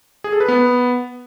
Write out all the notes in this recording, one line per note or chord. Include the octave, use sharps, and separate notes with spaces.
G#4
A4
B4
B3